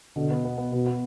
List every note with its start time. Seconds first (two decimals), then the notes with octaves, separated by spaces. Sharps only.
0.16 B2 D3
0.31 B3
0.45 B3
0.58 B3
0.72 B2 B3
0.87 B3